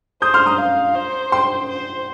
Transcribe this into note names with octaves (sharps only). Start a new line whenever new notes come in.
C5 D#6 G6
C6 F6
A#5 D#6
F5
C5
G5 C6
C5